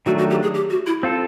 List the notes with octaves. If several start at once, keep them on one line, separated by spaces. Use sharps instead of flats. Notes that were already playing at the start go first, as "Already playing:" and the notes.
D#3 F#3 A3 D4 F#4
F#4
G4
G#4
G4
F#4
E4
C4 F4 A4